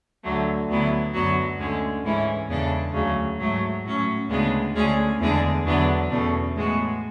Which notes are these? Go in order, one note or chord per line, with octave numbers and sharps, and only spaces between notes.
D2 D3 F#3 A3
D2 D3 F#3 B3 E4
F#2 D3 F#3 B3 F#4
D2 D3 G#3 C#4
G#2 E3 G#3 C#4 E4
E2 C#3 G#3 D4 A4
D2 C#3 F#3
G#2 F#3 A3
A2 F#3 C#4
D2 C#3 G#3 B3 D4
D2 D3 G#3 C#4 G#4
E2 D3 G#3 D4 G#4
E2 D3 F#3 B3 D4
E2 B2 A3 C#4
A2 G#3 B3 F#4